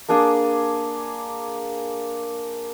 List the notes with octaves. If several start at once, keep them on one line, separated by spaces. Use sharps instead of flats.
A#3 D4 G#4